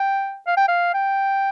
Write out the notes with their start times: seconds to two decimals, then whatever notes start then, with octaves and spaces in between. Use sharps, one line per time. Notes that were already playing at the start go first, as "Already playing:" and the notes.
Already playing: G5
0.47 F5
0.57 G5
0.68 F5
0.94 G5